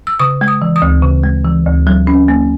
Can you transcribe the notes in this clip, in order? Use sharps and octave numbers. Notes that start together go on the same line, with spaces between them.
E6
C#3 D#6
G#3
D#6
E3
D#6
D2
C#3
G#3
E3
D2
F#3
C#4
A#3